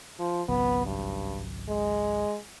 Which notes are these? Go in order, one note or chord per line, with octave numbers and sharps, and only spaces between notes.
F3
G#1 C#2 F#3 B3
G2
G#3